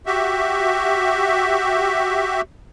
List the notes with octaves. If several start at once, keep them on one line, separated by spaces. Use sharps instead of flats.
F#4 G4 E5